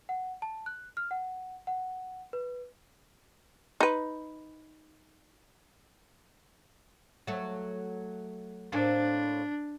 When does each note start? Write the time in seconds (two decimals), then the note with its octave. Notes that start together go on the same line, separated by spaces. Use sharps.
0.09 F#5
0.42 A5
0.66 F#6
0.97 F6
1.11 F#5
1.67 F#5
2.33 B4
3.80 D#4 B4
7.27 F#3 A3
8.72 A2 A#3 C4 D4